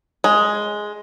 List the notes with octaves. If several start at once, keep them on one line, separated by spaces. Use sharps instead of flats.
G#3